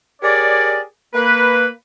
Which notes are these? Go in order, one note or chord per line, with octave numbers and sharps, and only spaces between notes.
G4 G#4 A#4 C#5 D5
A#3 B4